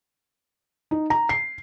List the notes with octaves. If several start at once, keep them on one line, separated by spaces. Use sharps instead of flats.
D#4
A#5
C7